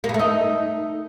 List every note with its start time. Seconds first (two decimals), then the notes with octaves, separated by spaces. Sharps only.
0.04 A#3
0.09 B3
0.14 A3
0.19 D#4